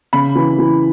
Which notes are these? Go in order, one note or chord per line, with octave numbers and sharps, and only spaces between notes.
C#3 B5
E3
E3